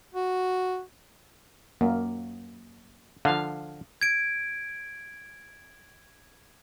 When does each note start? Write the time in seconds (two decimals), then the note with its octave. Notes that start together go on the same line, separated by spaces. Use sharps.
0.14 F#4
1.81 F#2 A#3
3.25 D3 F3 F5
4.01 G#6 D7